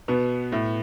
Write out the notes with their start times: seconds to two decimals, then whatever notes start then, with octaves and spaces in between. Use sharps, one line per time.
0.08 B2 B3
0.52 A2